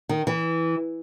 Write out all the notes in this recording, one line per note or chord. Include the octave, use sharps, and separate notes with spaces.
D#3
E3